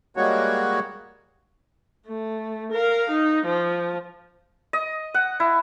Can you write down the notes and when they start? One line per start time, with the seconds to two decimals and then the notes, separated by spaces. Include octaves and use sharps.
0.17 G3 G#3 A#3 F#4 C#5
2.07 A3
2.73 A#4 F5
3.10 D#4
3.46 F3
4.73 D#5
5.14 F#5
5.40 E4